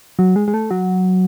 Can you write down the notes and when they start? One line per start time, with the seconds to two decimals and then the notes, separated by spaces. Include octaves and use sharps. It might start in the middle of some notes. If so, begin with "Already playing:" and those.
0.19 F#3
0.36 G#3
0.48 G#3
0.54 A3
0.71 F#3